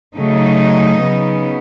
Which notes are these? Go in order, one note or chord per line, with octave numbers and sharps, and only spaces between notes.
C#3 F#3 A3 D#4
C#3 F#3 B3